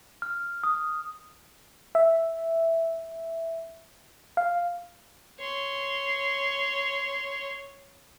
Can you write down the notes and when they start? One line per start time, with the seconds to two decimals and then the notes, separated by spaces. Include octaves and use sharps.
0.22 F6
0.63 D#6
1.95 E5
4.37 F5
5.40 C#5 C6